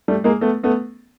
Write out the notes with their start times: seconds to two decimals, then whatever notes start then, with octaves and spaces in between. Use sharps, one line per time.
0.08 G3 A3
0.24 G#3 A#3
0.41 A3 B3
0.63 A3 B3